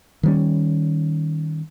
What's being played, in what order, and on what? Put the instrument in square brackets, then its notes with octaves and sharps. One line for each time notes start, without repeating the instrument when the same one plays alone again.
[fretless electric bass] D#3 G3 C#4